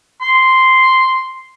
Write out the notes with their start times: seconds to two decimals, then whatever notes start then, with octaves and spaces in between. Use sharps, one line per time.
0.21 C6